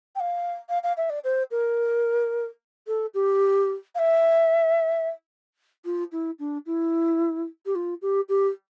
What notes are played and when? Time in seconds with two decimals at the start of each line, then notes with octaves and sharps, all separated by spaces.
0.15 G5
0.20 F5
0.69 F5
0.83 F5
0.97 E5
1.10 D5
1.24 C5
1.51 A#4
2.87 A4
3.14 G4
3.95 F5
3.99 E5
5.85 F4
6.12 E4
6.39 D4
6.66 E4
7.66 G4
7.75 F4
8.02 G4
8.29 G4